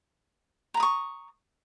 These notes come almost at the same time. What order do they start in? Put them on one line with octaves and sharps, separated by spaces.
A#5 B5 D#6 C#6